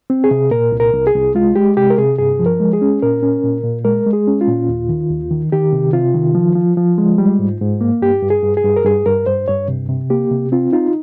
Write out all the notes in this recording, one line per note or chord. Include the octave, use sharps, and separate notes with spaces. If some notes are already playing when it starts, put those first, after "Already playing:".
C4
G#4
C3
A#2 A#4
C2
A#4
C2
G#4
C2
G#3 F4
G#3 G4
C3 G4
A#4
C3 G#4
G2 G#4
F3
A#4
G#3
G#4
C#4
A#2 A#4
C#4
A#2
A#2
G#3 A#4
G#3
G#4
C#4
F4
A#2
D#2
D#3
D#2
D#3
D#3 G4
C3
C3 F4
D#3
F3
F3
F3
G#3
G3
G#2
G#2
A#3
G2 G4
G2
G#4
G2
G#4
G2
A#4
G2 G#4
G2 A#4
G2 C5
G2 C#5
C3
C3
A#3 G4
C3
C4 F4
D#4 F4